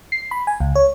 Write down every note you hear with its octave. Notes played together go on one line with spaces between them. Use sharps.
C7
B5
G#5
C#2
C#5